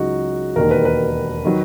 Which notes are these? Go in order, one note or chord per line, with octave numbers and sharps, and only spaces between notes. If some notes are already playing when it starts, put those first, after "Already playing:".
Already playing: C#2 C#3 F#3 D#4 F#4
E1 D#2 D#3 A#4
B4
B4
D#3 F#3